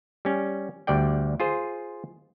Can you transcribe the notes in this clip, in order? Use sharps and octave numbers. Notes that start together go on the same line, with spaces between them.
G3 C#4
D2 G3 D5 G5
F4 G#4 C5